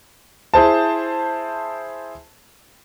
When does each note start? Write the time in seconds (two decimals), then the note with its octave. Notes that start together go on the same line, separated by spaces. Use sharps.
0.54 E4 G#4 C5 A5